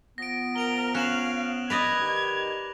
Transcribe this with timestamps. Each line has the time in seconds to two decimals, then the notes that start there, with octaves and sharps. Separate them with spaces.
0.18 F3 B3 A#6 D7
0.56 A#4 D7 F7 G7
0.95 C#4 F5 F#6 E7 F#7
1.70 B4 D5 D#5 G#6 A#6 F7
2.00 D#3 G4